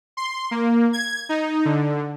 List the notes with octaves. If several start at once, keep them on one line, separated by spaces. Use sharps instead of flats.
C6
A#3
G#6
D#4
D3